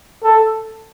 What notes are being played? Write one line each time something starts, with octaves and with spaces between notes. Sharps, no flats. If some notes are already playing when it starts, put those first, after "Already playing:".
A4